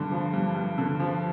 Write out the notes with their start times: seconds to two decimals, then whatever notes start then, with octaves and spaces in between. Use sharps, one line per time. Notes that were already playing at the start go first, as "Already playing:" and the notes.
Already playing: G2 D3
0.12 F3
0.33 G2
0.55 G2
0.78 D3
1.00 F3